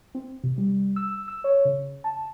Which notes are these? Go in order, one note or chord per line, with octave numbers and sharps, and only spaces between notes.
C4
C3
G3
E6
E6
C#5
C#3
A5